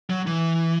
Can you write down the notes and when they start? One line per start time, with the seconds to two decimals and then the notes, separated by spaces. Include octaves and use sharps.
0.10 F#3
0.27 E3